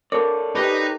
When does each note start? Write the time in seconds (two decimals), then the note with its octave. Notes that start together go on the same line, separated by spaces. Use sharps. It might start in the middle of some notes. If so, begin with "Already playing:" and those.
0.12 A4 A#4 C#5 D5
0.55 D#4 G4 B4